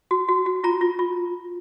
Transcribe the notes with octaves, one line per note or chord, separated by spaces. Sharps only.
F#4
F#4
F#4
F4 A#5
F4
F4